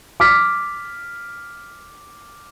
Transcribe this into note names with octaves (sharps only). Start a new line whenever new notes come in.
D6 F6 B6